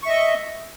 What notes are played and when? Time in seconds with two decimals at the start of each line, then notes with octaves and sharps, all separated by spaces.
0.03 C#6
0.06 E5
0.09 D#5